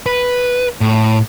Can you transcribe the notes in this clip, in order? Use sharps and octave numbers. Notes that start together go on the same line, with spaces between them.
B4
A2